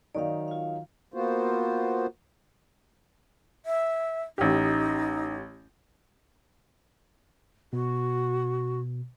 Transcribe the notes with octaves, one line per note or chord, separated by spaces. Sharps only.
D#3 F#3 D#4 D5 F5
F4 F5
A#3 B3 F4 F#4 C5
E5
A1 D#4 G4
B2 F#4